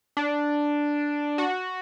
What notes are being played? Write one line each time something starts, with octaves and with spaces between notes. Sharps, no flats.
D4
F#4